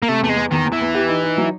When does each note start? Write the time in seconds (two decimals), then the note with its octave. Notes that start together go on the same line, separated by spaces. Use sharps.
0.03 A#3
0.09 C3 A3
0.22 E2 A3
0.29 G#3
0.36 E2
0.51 E2 D#3
0.65 E2
0.73 E3
0.81 E2
0.95 G4
1.09 D#4
1.23 D#4
1.38 F#3